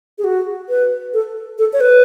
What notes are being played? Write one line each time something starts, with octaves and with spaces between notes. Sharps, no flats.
G#4
F#4
B4
A4
A4
C#5
B4